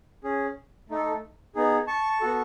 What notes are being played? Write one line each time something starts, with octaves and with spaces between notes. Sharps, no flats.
C#4 G#4
A3 D#4 A4
B3 D#4 G#4
A5 C#6
B3 F#4 A4